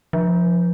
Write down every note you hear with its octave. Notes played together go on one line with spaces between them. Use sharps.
F3